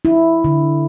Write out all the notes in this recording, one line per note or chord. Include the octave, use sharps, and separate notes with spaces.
E4
D3